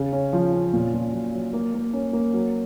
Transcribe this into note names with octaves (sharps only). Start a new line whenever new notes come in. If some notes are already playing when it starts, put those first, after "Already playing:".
Already playing: C#3
C#4
F3
C#4
A#2
A#2
F#3
F#3
A#3
A#3
C#4
A#3
F#3